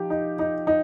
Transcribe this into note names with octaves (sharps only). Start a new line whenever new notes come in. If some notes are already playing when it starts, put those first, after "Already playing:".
Already playing: F3 D#4 G4
D#4
D#4
D#4